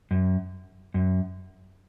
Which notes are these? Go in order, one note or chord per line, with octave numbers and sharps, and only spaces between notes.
F#2
F#2